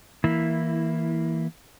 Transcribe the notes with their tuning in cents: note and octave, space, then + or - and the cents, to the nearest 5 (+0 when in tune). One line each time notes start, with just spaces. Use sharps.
E3 -10 A#3 +0 E4 +0